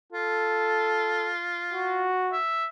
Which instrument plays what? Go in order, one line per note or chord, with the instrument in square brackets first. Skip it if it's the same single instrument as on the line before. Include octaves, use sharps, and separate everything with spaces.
[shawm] F4 [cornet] A4
[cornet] F#4
[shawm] E5